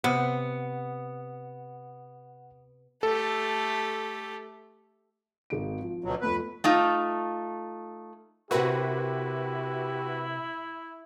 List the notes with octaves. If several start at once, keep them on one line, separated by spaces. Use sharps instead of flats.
C3 B3 F#5
A3 G4 A4
G#1 D#4 D7
F3
D2 B2 F#3
F2 A3 B3 B4
A3 D#4 F4
C3 E4 F#4 G4 A#4 B4